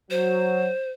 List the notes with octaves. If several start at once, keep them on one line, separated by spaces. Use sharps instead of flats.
F#3 C5